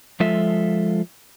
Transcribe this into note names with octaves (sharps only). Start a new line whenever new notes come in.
F3 G#3 F4 A4 E5